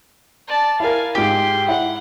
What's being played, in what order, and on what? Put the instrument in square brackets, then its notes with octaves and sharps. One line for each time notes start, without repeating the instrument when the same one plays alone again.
[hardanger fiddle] D5 A5
[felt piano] E4 A#4 [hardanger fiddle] F5 G#5
[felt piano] G#2 F4 [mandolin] G4 [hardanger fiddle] G#4 C6
[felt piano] E4 [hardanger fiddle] F#5